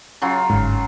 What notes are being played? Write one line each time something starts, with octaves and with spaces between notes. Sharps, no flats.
C#3 F#3 F4
G1 G#2